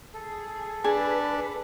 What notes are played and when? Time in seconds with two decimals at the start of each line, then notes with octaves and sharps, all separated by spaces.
0.14 G#4 A4
0.84 D4 G#4 B4